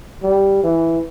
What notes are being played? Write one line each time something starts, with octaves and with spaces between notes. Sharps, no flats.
G3
E3